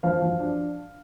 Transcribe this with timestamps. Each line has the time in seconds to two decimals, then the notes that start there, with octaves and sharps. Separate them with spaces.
0.03 F3 F5
0.22 F3
0.40 D4